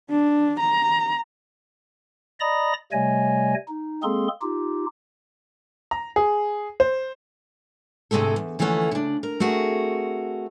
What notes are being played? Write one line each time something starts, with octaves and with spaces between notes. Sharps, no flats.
D4
A#5
D5 D#5 A#5 B5 D#6 A#6
C3 G3 A3 C#5 D#5 G#5
D#4
G#3 A#3 C4 G#4 A4 C6
D#4 F4 G4
A#5
G#4
C5
D2 G#2 C3 G#3 A3 A4
E2
D2 E3 F3 A3 C#4 F#5
C#3 D4
A#4
A3 C4 F#4 G#4 A#4